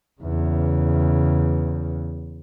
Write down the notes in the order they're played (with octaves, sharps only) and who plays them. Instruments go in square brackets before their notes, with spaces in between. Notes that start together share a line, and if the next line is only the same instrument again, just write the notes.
[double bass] E2 C#3